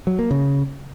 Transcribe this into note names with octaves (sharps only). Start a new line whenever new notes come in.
F#3
A#3
C#3